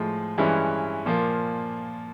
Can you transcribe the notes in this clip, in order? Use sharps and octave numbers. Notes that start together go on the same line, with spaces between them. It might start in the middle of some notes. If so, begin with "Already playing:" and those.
Already playing: A2 F3 G#3
G2 E3 G#3 C#4 E4
A#2 F3 A#3